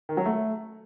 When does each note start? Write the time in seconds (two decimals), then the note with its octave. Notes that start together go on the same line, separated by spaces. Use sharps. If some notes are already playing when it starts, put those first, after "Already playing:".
0.09 D#3
0.17 F#3
0.26 A3